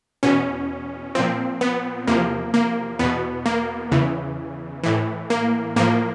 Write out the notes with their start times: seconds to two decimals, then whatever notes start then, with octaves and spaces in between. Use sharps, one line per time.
0.23 E2 B2 C#4
1.15 A#2 F3 C4
1.61 B3
2.08 E2 C3 F3 A#3
2.54 A#3
2.99 E2 B2 B3
3.46 A#3
3.91 E2 C#3 E3
4.84 A2 E3
5.30 A#3
5.76 A2 F3 A#3